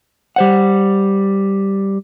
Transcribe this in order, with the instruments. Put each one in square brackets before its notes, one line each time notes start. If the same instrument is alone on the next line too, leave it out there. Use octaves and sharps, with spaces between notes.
[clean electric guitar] G3 C5 F#5